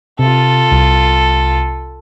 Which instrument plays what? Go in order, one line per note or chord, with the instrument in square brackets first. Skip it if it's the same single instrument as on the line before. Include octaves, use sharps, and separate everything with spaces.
[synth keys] C3 [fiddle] F4 A4
[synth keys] C2